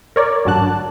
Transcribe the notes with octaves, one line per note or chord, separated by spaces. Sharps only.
A#4 C#5 D5
A1 G2 D3 F#3 A5 F#6